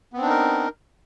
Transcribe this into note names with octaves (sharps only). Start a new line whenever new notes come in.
B3 C4 D4 D#4 A#4